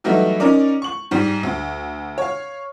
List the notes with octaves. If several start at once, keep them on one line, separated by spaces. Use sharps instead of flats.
E3 F#3 G3 A3 D#4 E4
C#4 D#4 A#4 D5
C#6 F#7
G#2 G3
D2
C#5 F5